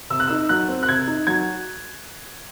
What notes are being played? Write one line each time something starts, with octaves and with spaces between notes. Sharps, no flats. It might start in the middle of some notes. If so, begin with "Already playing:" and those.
C3 E6
F#6
E6
D#4
F#3 F#6
C4
F#6
C3 G#6
D#4
F#3 G#6